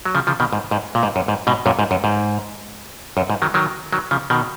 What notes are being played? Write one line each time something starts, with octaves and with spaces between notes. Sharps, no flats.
F#3
C#3 F3
C#3 F3
B2 D#3
G#2
G#2
A#2
G#2
F#2
G#2
G#2 B2
F#2 A#2
G#2
F#2
G#2
F#2
G#2
D#3 F#3
D#3 F#3
D#3 F#3
C#3 F3
B2 D#3